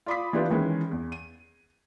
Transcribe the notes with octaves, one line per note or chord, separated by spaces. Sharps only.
F4 D5 B5 D6 D#6 B6
E3 B3 D4 F4 G4 B4
D#3 E3 G#3 C#4
E2
D#7